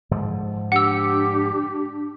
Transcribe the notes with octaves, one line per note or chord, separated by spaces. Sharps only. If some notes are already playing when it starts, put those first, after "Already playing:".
G#2 D3 F3
D4 G4 F#5 E6